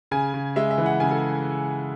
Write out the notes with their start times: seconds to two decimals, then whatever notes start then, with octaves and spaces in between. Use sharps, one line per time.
0.11 C#3 G#5
0.34 C#3
0.56 G#3 E5
0.71 E5
0.78 E3
0.86 F#5
1.00 C#3 G#5
1.11 A4